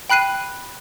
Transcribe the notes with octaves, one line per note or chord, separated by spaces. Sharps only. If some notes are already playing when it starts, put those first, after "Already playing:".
G5 B5 F#6 C7 D#7